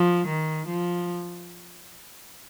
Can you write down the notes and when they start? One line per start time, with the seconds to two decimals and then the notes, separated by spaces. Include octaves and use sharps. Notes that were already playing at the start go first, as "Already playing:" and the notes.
Already playing: F3
0.28 D#3
0.67 F3